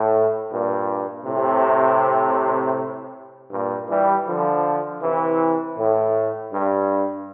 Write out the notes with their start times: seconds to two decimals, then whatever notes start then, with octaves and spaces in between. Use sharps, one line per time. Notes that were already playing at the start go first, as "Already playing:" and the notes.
Already playing: A2
0.51 G2 A#2
1.25 A2 C3
3.51 G2 A#2
3.89 E3 G3
4.26 D3 F3
5.02 C3 E3
5.77 A2
6.52 G2